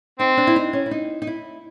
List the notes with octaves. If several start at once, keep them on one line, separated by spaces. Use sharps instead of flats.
C4 D#4
D4
E4
D#4
C#4
E4
D#4
D#4
E4